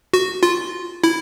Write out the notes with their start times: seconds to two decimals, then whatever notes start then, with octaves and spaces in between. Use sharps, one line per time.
0.13 F#4
0.43 F4
1.04 E4